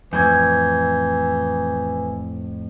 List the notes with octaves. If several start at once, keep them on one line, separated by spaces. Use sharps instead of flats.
F2 A2 E3 G6 G#6